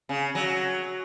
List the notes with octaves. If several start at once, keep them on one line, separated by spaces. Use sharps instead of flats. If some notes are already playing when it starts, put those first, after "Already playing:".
C#3
F#3